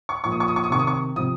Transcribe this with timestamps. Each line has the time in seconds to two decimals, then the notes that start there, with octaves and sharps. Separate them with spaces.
0.09 C#6
0.24 A#2 F3 C#6
0.32 D#6
0.40 C#6
0.48 D#6
0.56 C#6
0.64 D#6
0.70 C3 D#3 C#6
0.79 D#6
0.87 C#6
1.16 C3 F3 D#6